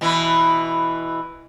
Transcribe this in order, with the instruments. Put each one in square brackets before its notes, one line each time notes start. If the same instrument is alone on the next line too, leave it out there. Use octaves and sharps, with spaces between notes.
[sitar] B2 E3 E4